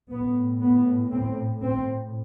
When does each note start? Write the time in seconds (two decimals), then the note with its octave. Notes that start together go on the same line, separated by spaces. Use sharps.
0.11 A2 B3
0.62 B3
1.12 C4
1.63 C4